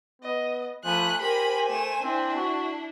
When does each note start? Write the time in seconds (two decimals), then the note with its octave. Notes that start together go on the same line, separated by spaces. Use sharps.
0.22 B3 D#5
0.85 F3 A3 G#5 B5 F#6
1.21 G4 A#4 C5 G#5 B5
1.69 A3 E7
2.03 C4 D4 E4
2.37 F#4